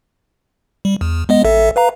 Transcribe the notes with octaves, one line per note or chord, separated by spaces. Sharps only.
G3
E2
G#3 B3 D#5
A1 A4 E5
B4 F5 A#5